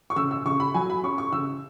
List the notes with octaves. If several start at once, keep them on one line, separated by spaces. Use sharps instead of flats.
C#6
C#3 E6
E6
C#3 C#6
B5
F#3 G#5
B5
C#4 C#6
C#6
C#3 E6